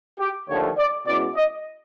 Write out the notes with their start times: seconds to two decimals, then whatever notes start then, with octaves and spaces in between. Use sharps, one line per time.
0.20 G4
0.49 D#2 D3 F3 A3 C#5
0.78 D5
1.06 B2 G#3 C#4 E4 D5
1.36 D#5